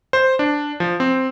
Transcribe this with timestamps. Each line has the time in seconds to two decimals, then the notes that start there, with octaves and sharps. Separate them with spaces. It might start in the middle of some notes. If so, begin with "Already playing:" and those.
0.13 C5
0.39 D4
0.80 F3
1.00 C4